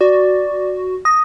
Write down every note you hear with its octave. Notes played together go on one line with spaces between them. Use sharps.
F#4 D5
D#6 A#6